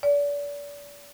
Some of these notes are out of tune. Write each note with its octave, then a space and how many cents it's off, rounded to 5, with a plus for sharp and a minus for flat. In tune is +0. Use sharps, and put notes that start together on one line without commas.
D5 -35